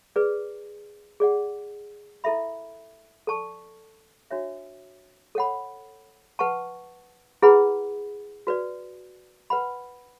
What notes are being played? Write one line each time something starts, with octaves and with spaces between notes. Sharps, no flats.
G#4 B4 D5
G#4 D5 F#5
E4 A4 E5 B5
A4 D5 A5 C#6
D4 F#4 C#5 E5
A4 C#5 F#5 B5
B4 F#5 A5 C#6
E4 G#4 B4 F#5 B5
F#4 B4 D5
B4 F#5 B5